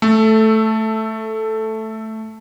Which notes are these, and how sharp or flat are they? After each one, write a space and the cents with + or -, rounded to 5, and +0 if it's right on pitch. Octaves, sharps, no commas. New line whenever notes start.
A3 +0 A4 -5